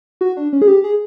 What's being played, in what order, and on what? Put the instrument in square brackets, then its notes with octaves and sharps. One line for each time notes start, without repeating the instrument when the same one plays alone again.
[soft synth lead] F#4
D4
C#4
G#4
G4
G#4